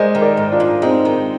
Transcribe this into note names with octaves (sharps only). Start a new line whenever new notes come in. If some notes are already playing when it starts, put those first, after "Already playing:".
Already playing: G#3 A#4 C5 D5 D#5
D#3
A#4 D5
G#2
D4 F4
G#2
G#3 C4 D#4
D#3